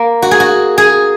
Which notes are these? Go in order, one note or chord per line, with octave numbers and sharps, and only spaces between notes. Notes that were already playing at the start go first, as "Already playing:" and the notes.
Already playing: A#3
F#4
G#4
F#4
G#4